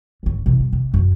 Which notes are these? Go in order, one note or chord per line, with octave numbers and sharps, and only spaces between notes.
G#2 C#3
C3 E3
G2
C3
F#2 F3